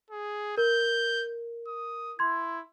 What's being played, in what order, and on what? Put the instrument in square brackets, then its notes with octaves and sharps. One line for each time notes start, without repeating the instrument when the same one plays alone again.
[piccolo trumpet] G#4
[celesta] A#4 [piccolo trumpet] G6
[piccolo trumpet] D#6
[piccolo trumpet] E4 [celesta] C6 G#6